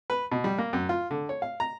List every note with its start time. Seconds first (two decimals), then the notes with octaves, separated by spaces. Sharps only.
0.10 B4
0.32 B2
0.44 G3
0.58 A#3
0.73 F#2
0.89 F4
1.11 D3
1.29 C#5
1.42 F5
1.60 A#5